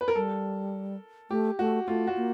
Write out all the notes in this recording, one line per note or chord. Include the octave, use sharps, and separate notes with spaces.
B4
A#4
G3 A4
A3 G4
A3 F#4
A3 F4
F#4
A#3